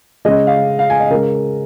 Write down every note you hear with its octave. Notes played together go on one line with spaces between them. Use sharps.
C#3 G#3 D#5
F5
F5
G#5
D#5
C#3 G#3 A#4